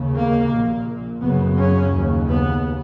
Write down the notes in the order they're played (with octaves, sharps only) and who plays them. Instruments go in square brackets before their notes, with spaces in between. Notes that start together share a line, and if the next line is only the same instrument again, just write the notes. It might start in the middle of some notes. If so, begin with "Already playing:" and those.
Already playing: [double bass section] D#2 C#3
A#3
A#1 A#2
F#1 F#2 C#3 B3
C#4
D#2 C#3
B3